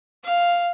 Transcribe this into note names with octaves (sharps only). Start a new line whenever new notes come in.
F5